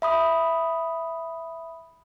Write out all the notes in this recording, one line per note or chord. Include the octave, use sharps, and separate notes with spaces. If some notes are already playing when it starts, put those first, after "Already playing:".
E5 B5 D#6